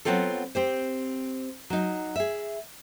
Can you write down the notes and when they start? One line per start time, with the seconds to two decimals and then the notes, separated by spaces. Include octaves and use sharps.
0.05 F#3 G#3 B3 C4 F4 A4
0.55 C4 G4 C5
1.70 F#3 D#4
2.16 G#4 E5